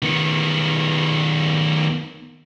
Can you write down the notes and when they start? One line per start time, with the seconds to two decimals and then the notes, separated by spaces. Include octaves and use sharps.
0.02 D#3 B3